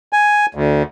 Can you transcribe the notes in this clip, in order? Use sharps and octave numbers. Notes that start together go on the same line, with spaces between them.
G#5
D2